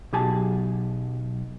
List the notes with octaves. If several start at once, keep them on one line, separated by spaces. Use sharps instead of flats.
B1 F#3 G4 G#4 G#5 A5